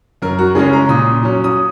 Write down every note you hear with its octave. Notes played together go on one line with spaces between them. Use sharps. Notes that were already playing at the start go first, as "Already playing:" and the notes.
F#2 A#4
F#4
C#3 G#3 C#4 G#4
A#5
A#2 D#6
F#3 C#4
D#6